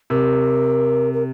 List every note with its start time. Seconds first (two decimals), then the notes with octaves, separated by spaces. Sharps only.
0.10 C3 A#4
1.14 A#4